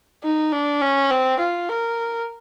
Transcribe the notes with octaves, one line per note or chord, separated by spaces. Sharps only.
D#4
D4
C#4
C4
F4
A#4